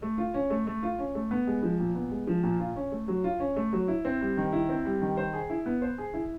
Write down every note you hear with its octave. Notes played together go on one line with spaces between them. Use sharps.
A3
F4
C#4
A3
A3
F4
C#4
A3
B3
G#3
F3
A#2
B3
G#3
F3
A#2
F4
C#4
A3
F#3
F4
C#4
A3
F#3
E4
C4
G3
D#3
E4
C4
G3
D#3
C5
G#4
E4
B3
C5
G#4
E4